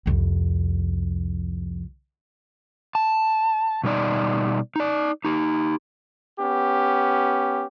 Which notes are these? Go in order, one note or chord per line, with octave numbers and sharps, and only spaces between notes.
C2 F2
A5
B2 G3 D#4 D5
D#4 D5
D#4 G4
B3 C#4 G4